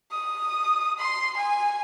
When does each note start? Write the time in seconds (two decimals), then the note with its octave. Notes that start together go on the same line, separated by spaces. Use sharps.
0.12 D#6
0.99 C6
1.36 G#5